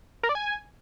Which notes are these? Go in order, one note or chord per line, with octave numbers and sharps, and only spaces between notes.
A#4
D5
G#5